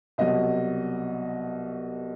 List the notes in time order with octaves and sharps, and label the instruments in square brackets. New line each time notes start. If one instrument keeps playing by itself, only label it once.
[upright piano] C2 B2 F#3 D#5